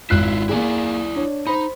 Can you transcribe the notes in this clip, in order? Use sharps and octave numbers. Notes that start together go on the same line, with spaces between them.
G#1 E4 F4 F#6 C7
A#3 E4 G#4 D5 G#5
D4 C#5
D#4 C5 B5